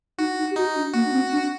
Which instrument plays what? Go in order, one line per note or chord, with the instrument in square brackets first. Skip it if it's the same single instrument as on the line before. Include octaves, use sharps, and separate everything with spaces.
[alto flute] D#4 [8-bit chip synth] F#4
[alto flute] D#4
G4
[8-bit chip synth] D#4 [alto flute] F#4
[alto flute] D4
[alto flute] A#3 [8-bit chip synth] F#4
[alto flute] D4
C4
D4